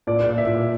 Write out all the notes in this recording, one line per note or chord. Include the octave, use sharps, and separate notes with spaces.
A#2 D5
A#2
E5
A#2